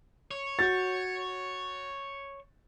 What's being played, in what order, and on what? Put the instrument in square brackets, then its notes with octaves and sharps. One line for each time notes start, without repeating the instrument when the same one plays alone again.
[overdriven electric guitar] C#5
[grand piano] F#4 G6 A6